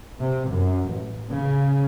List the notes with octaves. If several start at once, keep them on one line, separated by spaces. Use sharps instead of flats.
C3
F#2
A1
C#3